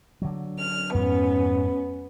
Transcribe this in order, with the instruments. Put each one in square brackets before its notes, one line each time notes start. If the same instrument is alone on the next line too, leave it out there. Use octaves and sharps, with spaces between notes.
[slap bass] D3 F#3
[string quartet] F6
[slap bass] F2 G#2 [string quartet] B3 C#4